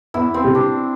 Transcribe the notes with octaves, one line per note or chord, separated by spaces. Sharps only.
E2 E4
C4
C3 G3
D4